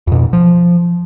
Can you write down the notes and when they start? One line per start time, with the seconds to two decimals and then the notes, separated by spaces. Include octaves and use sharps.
0.07 F2 B2
0.33 F3